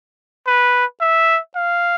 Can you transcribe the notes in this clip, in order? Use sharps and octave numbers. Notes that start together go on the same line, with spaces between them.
B4
E5
F5